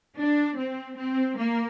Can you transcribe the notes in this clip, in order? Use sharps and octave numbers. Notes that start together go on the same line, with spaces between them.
D4
C4
C4
A#3